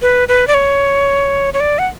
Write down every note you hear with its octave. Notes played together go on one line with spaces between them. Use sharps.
B4
B4
D5
C#5
C#5
D5
F#5